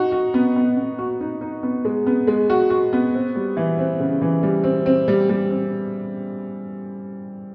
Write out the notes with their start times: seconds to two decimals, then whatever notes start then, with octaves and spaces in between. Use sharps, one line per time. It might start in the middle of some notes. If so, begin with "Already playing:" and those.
Already playing: D#4 F#4
0.12 F#4
0.34 B3
0.56 B3
0.77 B3
0.99 F#4
1.21 D#4
1.41 D#4
1.63 B3
1.85 G#3
2.07 B3
2.27 G#3
2.50 F#4
2.70 F#4
2.93 B3
3.14 C4
3.35 G3
3.57 E3
3.79 C4
4.00 C#3
4.22 E3
4.43 G3
4.64 C4
4.86 C4
5.08 G3
5.29 G3
5.51 C4